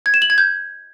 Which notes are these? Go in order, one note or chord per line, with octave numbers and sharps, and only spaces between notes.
G#6
E7
F#7
G#6
G6